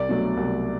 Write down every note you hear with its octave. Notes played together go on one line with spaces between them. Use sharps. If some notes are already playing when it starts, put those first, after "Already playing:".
Already playing: C2 D5
B2 F#3 A3
C2